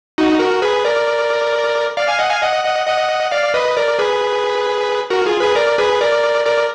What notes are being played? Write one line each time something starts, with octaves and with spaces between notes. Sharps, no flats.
D#4 F#4
F#4 A#4
G#4 B4
A#4 D5
D5 F5
F5 G#5
D#5 F#5
F5 G#5
D#5 F#5
D#5 F#5
D#5 F#5
D5 F5
B4 D#5
A#4 D5
G#4 B4
F#4 A#4
F4 G#4
G#4 B4
A#4 D5
G#4 B4
A#4 D5
A#4 D5